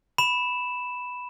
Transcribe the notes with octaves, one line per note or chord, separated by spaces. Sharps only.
B5 E7